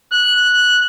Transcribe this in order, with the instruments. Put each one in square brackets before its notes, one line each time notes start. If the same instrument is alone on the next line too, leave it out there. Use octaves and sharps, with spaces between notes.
[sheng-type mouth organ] F#6